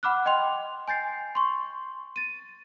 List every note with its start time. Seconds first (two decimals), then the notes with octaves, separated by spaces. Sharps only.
0.03 F#5 B5 D6 F6 F#6
0.26 D#5 G5 C6 F7
0.88 G#5 G6 A6 C7
1.35 C6 C#6
2.16 A6 D#7